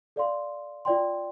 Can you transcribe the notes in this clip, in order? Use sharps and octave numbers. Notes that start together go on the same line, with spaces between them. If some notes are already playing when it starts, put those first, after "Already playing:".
A4 D5 F5 C6
F4 D5 G5 C6